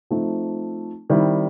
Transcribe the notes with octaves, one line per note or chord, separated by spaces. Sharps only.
F3 A3 C4 D#4
D#3 G3 C4 E4